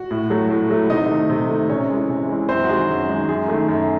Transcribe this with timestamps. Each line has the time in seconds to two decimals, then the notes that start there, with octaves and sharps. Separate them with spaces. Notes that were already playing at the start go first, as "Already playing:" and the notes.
Already playing: F#4
0.11 A2
0.30 F#3 A3
0.50 A2
0.70 F#3 A3
0.90 C3 D#4 D#5
1.10 D#3 A3
1.30 C3
1.50 D#3 A3
1.70 C3 C#4 C#5
1.90 E3 G#3
2.09 C3
2.29 E3 G#3
2.49 F#2 C4 C5
2.64 F#4
2.69 D#3 G#3 G#4
2.89 F#2
3.09 D#3 G#3
3.29 F#2 G#4
3.48 D#3 A3
3.69 F#2